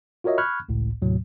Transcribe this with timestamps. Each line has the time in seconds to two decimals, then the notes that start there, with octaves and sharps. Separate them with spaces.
0.24 F4 F#4 A#4 C#5 D#5 E5
0.38 B5 C#6 F6 F#6 G#6
0.69 G#1 C#2 A2
1.02 D#2 A2 C3 F#3